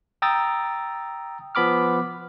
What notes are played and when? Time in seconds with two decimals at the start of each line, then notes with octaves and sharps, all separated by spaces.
0.22 G5 A#5 D#6 E6 A6
1.55 F3 B3 B5 D6 F6